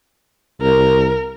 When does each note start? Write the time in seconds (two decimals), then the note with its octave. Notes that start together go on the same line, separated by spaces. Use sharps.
0.62 C2 A#4